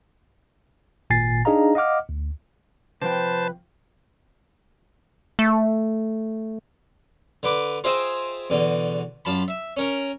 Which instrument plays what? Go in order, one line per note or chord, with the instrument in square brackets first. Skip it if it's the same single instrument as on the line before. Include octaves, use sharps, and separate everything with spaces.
[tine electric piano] G#1 A#2 G#5 A6 C7
D4 D#4 G#4 D#5 F5 A#5
D#5 F5 F#5 D6 F6
D2
[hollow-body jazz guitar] C3 F3 G5 [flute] B4 [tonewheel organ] C5 A5
[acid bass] A3
[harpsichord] D3 B4 D6
F4 G#4 C5 D#5 E5 G5
E2 B2 D3
F#2 F4 A5 B5
E5
C#4 A#4